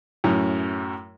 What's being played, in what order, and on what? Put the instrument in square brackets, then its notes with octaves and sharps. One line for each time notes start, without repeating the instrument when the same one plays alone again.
[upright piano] F#2 A2 C#4